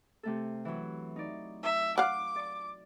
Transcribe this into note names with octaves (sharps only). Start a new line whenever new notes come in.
C3 A3 A4
E3 F#3
D#4 D5
E5
F5 F#5 D6
D5